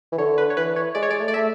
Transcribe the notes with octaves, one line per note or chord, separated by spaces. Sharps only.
E3
D3 C#5
B4
C#5
E3 B4
C#5
G#3 D5
C#5
G#3 D5
A3
D5
A3 E5